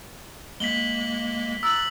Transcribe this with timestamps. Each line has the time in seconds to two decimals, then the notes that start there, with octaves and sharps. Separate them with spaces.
0.60 G#3 A#3 B6 F#7 G7
1.63 A#5 E6 F#6 A6 F#7